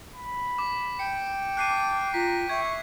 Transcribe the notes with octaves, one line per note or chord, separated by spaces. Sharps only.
B5
D6
G5 C#7
A5 D6 F#6 C7 D#7
F4 A#5 B6
E5 C#6 G#6